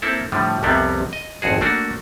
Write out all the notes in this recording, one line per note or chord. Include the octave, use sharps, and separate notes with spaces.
A#3 C4 E4 A4
A2 D3 F3 G3
C2 F2 C3 G3 B3 C4
D#5
G#1 F2 F#4 G#4
A3 A#3 D4 F#4